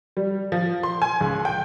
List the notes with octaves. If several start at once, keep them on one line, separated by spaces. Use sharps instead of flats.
G3
F3
C6
G#5
C#2
G5